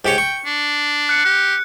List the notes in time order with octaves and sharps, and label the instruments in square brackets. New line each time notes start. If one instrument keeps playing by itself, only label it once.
[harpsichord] G#2 G4 C#5 [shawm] G5
[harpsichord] C#6
[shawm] D4
[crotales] F#6 C#7
[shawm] G4 [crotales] F#6